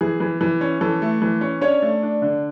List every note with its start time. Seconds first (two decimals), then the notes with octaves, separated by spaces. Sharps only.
0.01 E3 G#4
0.20 E3
0.41 E3
0.61 C#4
0.81 E3 A4
1.02 A3
1.22 E3
1.41 C#4
1.61 C#4 D4 C#5
1.82 A3
2.03 D4
2.22 D3